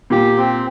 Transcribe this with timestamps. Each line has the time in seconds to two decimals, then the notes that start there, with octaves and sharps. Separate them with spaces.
0.10 A#2 G4
0.37 C4